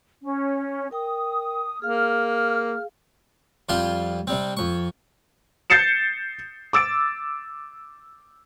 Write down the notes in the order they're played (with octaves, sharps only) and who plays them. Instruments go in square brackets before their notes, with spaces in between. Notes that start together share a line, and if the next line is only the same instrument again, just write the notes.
[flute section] C#4
[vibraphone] A#4 G5 [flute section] D#6
[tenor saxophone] A#3 [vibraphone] G#4 F5 [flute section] F6
[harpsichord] F2 G3 F4 G4 C6
C3 G3 C4
F2 C#6
[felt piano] G6 A6 C7 C#7 E7
D6 E6 A6 D7